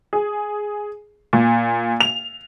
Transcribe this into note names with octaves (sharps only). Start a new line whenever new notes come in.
G#4
A#2
F7